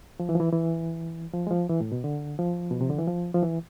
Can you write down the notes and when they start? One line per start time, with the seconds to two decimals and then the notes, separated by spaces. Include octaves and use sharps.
0.20 F3
0.29 E3
0.35 F3
0.40 E3
0.53 E3
1.33 F3
1.47 G#3
1.50 F3
1.69 E3
1.81 A2
1.92 B2
2.04 D3
2.39 F3
2.71 B2
2.81 C3
2.90 D3
2.98 E3
3.08 F3
3.34 F3
3.42 E3